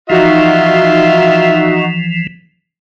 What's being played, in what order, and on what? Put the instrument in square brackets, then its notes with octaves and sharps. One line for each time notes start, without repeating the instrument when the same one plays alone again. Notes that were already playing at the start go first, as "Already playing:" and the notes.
[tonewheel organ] E3 F3 [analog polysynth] D#4 F#4 [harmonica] F4 E5